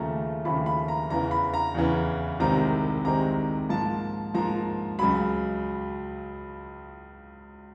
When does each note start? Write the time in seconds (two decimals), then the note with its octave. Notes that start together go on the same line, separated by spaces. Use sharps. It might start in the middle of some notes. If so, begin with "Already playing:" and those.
Already playing: D#2 C#3 F3 A3 A#5
0.45 D#2 C#3 F3 A3 B5
0.66 B5
0.88 A#5
1.10 E2 C#3 E3 A#5
1.31 B5
1.54 A#5
1.75 E2 C#3 E3
2.40 C2 C3 D#3 G#3 C4 A#5
3.05 C2 C3 D#3 G#3 C4 A#5
3.69 G#2 F3 A#3 A5
4.34 G#2 F3 A#3 A#5
4.99 C#2 C#3 F#3 B5